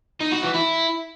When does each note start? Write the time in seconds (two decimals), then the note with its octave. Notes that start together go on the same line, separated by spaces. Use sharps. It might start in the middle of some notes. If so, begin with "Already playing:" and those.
0.20 D#4
0.32 F#4
0.43 E3
0.54 E4